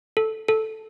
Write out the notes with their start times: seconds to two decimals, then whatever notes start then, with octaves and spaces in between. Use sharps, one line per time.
0.17 A4
0.48 A4